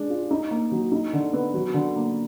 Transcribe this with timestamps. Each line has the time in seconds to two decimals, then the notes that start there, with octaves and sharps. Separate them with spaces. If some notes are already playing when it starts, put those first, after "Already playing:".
Already playing: G#3 D4
0.10 F4
0.31 D#4
0.51 A#3
0.72 F#3
0.92 D#4
1.13 D3
1.33 B3
1.54 F#3
1.74 D3
1.96 A#3